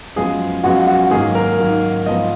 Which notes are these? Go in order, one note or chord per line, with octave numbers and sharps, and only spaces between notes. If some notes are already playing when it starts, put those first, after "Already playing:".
F#2 F3 G#3 B3 G#4
F#2 F3 G#3 B3 F#4
F#4
G#2 D#3 F#3 A#3 G#4
A#4
G#2 D#3 F#3 A#3
G#2 F3 B3 D#5